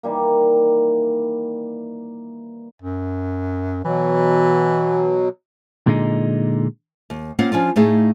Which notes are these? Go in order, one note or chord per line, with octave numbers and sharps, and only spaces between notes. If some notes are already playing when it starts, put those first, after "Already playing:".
D#3 E3 G3 A#3
F#2
B2 E3 F#3
A#2 D3 G#3 D#4
D#2
A#3 C4 C#4 F4 F5 F#5
F3 C#4 D4 F4
A2 A3 D#4 G#4 F5